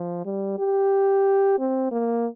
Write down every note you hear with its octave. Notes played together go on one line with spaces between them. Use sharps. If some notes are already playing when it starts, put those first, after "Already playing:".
Already playing: F3
G3
G4
C4
A#3